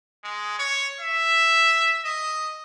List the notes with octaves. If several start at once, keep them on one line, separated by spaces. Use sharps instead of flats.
G#3
C#5
E5
D#5